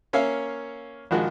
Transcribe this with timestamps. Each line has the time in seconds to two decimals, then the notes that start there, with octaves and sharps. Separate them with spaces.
0.13 A#3 C#4 C#5 E5 F5
1.11 A#1 D#3 F3 G#3 F#4